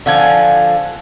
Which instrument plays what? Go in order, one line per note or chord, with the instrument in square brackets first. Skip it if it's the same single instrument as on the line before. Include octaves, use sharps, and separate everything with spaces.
[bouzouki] D3 F3 G#5